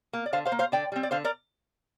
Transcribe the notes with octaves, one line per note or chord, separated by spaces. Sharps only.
A#3
D5
D3 C5 F5
C5 F5
A#3
C5 F5
D3 D5 G5
G3 C4
D5
D3 C5 F5
A#4 D5